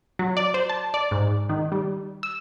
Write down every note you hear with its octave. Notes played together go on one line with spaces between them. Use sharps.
F#3
D5
C5
A5
D5
G#2
D#3
G3
E6